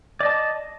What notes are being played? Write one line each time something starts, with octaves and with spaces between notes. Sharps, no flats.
D5 D#5 A5